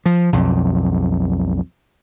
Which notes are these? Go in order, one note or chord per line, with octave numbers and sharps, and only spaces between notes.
F3
B1 F2